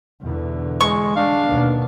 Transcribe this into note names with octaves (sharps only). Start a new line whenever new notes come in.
E2 B2 D3
G#3 C#6
G#3 D4 F5
D#2 B2 B3